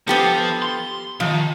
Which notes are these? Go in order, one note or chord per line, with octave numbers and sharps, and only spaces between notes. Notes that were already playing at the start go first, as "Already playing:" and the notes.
F3 B3 G4 A4
C6
B1 D#3 F3